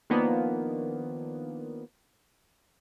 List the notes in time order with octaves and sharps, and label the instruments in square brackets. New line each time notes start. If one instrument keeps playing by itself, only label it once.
[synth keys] D#3 F3 A#3 B3 D4